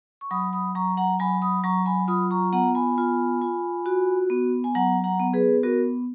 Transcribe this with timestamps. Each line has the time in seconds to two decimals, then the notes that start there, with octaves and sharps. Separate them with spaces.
0.21 C#6
0.31 F#3 B5 D#6
0.53 B5 D#6
0.75 F#3 A#5 C#6
0.97 F#5 A#5
1.19 F#3 G#5 B5
1.42 B5 D#6
1.63 F#3 A#5 C#6
1.86 G#5 B5
2.08 F4 B5 D#6
2.31 A#5 C#6
2.53 B3 F#5 A#5
2.75 G#5 B5
2.98 F4
3.42 F4
3.86 F#4
4.30 B3
4.64 G#5
4.74 F#3 F#5 A#5
5.04 F#5 A#5
5.20 B3
5.34 G#4 B4
5.63 B3 F#4 A#4